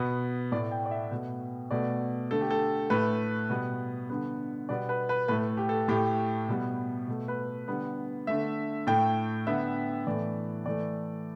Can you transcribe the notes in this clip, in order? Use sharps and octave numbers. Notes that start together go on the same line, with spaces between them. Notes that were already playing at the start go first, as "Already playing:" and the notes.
Already playing: B2 B3
A2 A3 D5
G5
D5
E5
B2 A3
B2 A3 D5
D3 A3 A4
G4
A4
A2 A3 B4
B2 G3 B3
D3 G3 B3
B2 G3 B3 D5
B4
B4
A2 A3 B4
G4
A4
A2 A3 G4
B2 G3 B3
B2 A3
B4
D3 G3 B3
D3 A3 E5
A2 A3 G5
D3 B3 E5
A2 E3 A3 D5
A2 E3 A3 D5